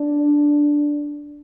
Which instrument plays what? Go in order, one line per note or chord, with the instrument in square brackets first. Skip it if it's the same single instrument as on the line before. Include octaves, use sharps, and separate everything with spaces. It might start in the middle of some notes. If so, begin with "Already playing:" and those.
Already playing: [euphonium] D4